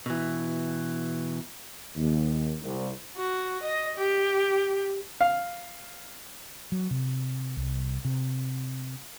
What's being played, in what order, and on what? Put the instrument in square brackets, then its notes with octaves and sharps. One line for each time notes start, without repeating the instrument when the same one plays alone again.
[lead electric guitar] B2 E3
[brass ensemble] D#2
C2
[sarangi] F#4
D#5
G4
[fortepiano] F5
[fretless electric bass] F#3
C3
C2
C3